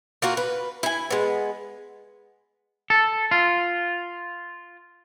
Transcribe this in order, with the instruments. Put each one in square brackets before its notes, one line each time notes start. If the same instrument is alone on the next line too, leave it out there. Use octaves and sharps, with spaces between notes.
[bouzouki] A#3 F4 F#4 A#4
B4
E4 G#5
G#3 B3
[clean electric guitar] A4
F4